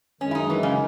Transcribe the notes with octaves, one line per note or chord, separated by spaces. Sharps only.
F#2 D#3 G#3 C#4
E4
D#4
E3
C#3